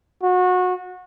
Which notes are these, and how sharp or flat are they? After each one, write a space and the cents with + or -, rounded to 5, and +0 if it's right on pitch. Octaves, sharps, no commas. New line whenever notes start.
F#4 -25